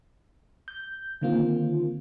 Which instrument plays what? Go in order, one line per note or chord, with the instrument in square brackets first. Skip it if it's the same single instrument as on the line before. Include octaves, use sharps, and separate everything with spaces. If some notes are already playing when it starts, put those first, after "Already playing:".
[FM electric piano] G6
D3 D#3 A#3 C4 F4